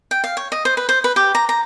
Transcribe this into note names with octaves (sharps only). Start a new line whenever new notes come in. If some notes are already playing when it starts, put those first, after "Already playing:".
G5
F5
C#5
D#5
C5
B4
C5
B4
G4
A#5
A#5